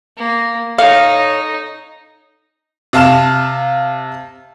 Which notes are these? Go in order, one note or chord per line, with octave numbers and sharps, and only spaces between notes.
A#3
D#4 A4 C#5 F5
C3 F5 A5 F6 E7